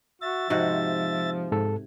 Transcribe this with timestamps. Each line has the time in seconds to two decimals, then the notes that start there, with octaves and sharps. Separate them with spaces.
0.22 F#4 E5 A6
0.50 G#2 C3 F3 F#4
1.52 G#2 A4